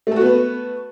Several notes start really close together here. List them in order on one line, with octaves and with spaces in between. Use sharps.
A3 A4 F#4 B3 B4